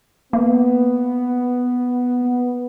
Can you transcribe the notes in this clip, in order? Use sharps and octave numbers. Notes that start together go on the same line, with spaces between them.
A#3 B3